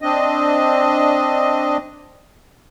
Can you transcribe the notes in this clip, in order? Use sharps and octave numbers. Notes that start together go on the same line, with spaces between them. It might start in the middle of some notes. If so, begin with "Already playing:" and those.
C4 D4 D#5